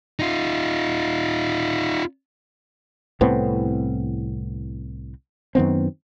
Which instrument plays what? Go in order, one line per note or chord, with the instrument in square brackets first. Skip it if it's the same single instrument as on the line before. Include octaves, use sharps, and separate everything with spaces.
[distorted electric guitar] D#4 F4
[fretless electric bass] C2 A2 B3 C4
F#2 D#3 B3 C4